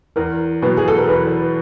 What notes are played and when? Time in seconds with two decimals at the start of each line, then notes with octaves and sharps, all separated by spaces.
0.16 E2 A#4
0.62 B2 F#3 B3 B4
0.77 G#4
0.88 A4
0.98 A#4
1.08 E2 B4